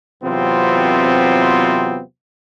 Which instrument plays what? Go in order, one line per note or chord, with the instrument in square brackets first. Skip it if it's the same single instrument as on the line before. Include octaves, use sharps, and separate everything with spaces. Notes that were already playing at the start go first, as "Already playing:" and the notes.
[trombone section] E2 C3 F#3 B3 C4 F4